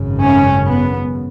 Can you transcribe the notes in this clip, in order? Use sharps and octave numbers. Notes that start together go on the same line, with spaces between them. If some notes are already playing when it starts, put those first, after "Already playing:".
Already playing: G#1 F#2 C#3
C#4
B3